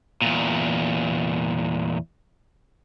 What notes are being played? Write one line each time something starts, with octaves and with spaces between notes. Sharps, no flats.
E2 A#2